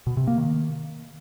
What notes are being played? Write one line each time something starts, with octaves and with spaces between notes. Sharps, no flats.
B2
C3
A#3
D#3